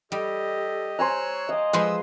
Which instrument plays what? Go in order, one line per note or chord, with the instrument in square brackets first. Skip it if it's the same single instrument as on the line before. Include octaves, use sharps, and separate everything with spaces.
[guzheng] G3 [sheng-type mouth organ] G4 D#5 [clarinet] A4
[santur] C5 G#5 A#5 [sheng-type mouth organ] C#5 E6 F#6
[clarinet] D#5 [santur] F5 D6
[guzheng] F3 G#3 B4 [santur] C6 [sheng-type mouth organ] D#6 E6